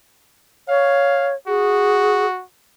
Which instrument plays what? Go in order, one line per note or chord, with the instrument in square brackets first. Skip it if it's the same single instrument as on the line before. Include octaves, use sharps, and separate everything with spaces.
[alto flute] C#5 [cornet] F5
[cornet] F#4 [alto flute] G#4